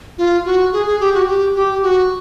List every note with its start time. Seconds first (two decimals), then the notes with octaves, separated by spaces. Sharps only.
0.18 F4
0.45 F#4
0.73 G#4
0.87 G#4
1.00 G4
1.14 F#4
1.28 G4
1.55 G4
1.83 F#4